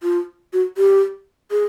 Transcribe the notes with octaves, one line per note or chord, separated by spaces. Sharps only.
F4
F#4
G4
G#4